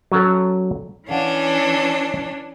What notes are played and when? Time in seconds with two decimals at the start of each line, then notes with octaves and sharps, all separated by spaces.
0.12 F#3 C#4 A4
1.09 E3 C#4 D4 F5 F#5